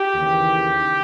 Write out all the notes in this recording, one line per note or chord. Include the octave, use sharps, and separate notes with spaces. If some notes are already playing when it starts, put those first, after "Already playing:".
Already playing: G4
D#2 C#3 E3